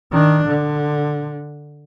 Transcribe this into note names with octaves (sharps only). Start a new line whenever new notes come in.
D#3 D4
D3